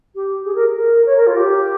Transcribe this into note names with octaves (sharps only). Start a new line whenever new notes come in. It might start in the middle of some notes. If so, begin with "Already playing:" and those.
G4
G#4
A#4
A#4
C#5
A#4
F4
G4